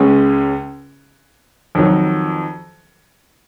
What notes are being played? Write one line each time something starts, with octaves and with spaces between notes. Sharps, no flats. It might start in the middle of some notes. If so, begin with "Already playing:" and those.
Already playing: C#2 C#3 G#3 C#4
F2 D#3 F#3